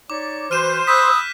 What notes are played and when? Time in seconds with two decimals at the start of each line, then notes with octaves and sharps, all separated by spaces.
0.10 D#4 C#5 D5 D6
0.51 E3 F#4 B4 C5 F6 D#7 E7
0.87 B5 D#6 E6 F#6 G6 B6